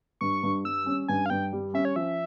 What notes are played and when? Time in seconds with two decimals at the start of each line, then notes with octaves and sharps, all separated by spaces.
0.21 G2 C#6
0.43 G2
0.64 G3 E6
0.86 C#4
1.08 G2 G#5
1.26 F5
1.30 G2 G5
1.53 G3
1.74 C#4 E5
1.85 C#5
1.96 F3 E5